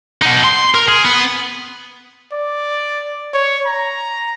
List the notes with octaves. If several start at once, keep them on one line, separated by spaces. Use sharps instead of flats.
B2 D#4
C6
A#4
G#4
B3
D5
C#5
A#5